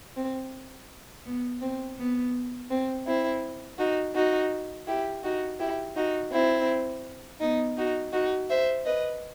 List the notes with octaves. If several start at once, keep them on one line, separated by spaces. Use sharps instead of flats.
C4
B3
C4
B3
C4
C4 E4
D#4 F#4
D#4 F#4
E4 G4
D#4 F#4
E4 G4
D#4 F#4
C4 E4
B3 D#4
D#4 F#4
D#4 F#4
C5 E5
B4 D#5